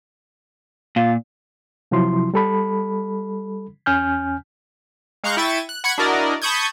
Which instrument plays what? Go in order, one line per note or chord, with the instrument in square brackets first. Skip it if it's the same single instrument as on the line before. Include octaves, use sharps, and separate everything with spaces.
[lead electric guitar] A#2 [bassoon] F4
[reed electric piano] C3 F3 F#3 E4 C6
G3 A4 B5
E2 C#4 G#5 F6 G6
[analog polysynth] G#3 F5 A#5 C#6 F#6 G6
E4 E5 G5 C#6 A6 D#7
F#6
F#5 B5 C#6 F#6 G#6 C#7
D4 E4 F#4 A#4 D5 D#5
A5 B5 C#6 D#6 G6 G#6